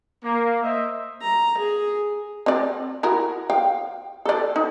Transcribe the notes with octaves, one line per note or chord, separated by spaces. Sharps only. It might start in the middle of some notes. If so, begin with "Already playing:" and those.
A#3
C5 D#5 E5
A#5
G#4
C4 D5
E4 F#4 A#4
F5 G5
A4 D5
D#4